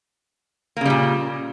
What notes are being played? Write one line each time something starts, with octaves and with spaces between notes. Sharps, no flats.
A#2 C#3 G3 A#3